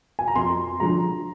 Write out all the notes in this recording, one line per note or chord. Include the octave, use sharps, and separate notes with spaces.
G#5
A#5
F2 C6
D3 F3 G#3 A#5